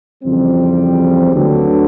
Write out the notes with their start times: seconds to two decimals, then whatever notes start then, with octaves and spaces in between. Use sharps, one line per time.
0.24 F2 C#3 E3 G3 C4
1.32 D2 D3 F#3 B3